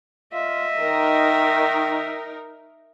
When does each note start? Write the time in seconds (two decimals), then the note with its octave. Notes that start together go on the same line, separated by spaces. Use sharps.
0.33 F4 D#5 E5
0.79 D#3 D#4 A#4